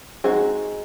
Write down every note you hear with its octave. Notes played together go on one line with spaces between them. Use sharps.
G#3 C4 D#4 F#4 G#4